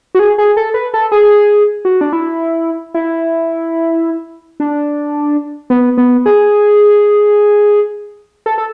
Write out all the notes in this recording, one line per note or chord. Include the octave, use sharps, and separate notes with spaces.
F#4
G#4
G#4
A4
B4
A4
G#4
F#4
D4
E4
E4
D4
B3
B3
G#4
A4
A4